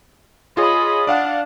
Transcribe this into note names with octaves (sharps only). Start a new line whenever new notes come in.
F4 G#4 C#5 D#5 B5
D4 D5 F5 F#5